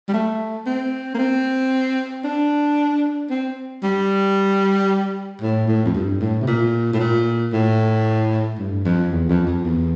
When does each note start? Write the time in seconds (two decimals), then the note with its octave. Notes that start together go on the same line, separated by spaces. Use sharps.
0.09 G3
0.13 A3
0.66 C4
1.14 A#3
1.19 C4
2.25 D4
3.30 C4
3.83 G3
5.42 A2
5.68 A2
5.86 F2
5.95 G2
6.21 A2
6.41 C3
6.48 A#2
6.93 A2
7.00 A#2
7.53 A2
8.59 G2
8.85 F2
9.12 E2
9.29 F2
9.47 F2
9.65 E2